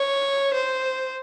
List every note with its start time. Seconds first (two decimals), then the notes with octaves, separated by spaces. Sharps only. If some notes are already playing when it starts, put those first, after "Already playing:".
Already playing: C#5
0.54 C5